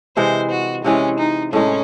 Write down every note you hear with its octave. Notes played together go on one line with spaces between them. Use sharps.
C3 E3 G#3 C5
F#4
C3 E3 G#3 C#4
D#4
A2 G#3 C#4 D#4